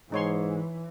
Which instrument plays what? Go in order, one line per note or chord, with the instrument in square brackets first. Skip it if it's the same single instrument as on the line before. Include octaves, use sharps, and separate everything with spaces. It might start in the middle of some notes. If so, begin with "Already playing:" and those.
[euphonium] G#2 [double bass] E3 [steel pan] D#4 C#5 C6